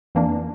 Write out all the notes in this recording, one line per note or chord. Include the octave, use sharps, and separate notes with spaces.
F2 E3 A#3 D4